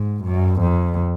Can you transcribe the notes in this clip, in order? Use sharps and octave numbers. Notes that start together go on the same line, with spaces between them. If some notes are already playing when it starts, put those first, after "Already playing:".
Already playing: G#2
F#2
F2